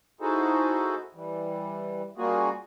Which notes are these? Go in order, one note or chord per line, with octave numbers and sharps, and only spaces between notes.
D#4 E4 F#4 G#4 A4 C5
E3 G3
G3 A#3 C#4 F4 F#4 G#4